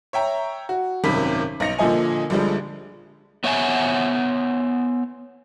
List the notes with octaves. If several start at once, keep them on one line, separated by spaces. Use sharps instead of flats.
C#5 E5 G5 A#5
F#4
G#1 F#2 C3 D#3 B5 B6
B1 D#4 A#6 C#7 F7
A#2 D3 F3 D#5 G#5
A#1 D3 F3 G3 G#3
B3 C#5 E5 F#5 G#5